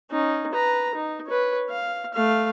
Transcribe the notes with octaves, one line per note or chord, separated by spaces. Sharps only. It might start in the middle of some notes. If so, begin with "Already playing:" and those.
C#4 D#4
B4 A#5
D#4
B4 C#5
F5
A3 F5